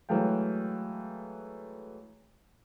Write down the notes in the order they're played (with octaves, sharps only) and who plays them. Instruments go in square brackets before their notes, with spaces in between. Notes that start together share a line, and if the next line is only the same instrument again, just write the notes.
[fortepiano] E3 F#3 G#3 A3 F5 G5